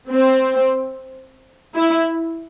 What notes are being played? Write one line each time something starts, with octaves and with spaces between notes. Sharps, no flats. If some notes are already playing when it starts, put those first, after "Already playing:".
C4
E4